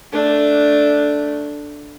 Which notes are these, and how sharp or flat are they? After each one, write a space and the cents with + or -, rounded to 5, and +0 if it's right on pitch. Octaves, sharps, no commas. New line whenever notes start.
A3 +0 D4 +0